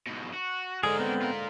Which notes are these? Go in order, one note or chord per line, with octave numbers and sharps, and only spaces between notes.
G#2 B2
F#4
G#2 D3 G#3 G#4 A#4
B3 C4
F4 A#4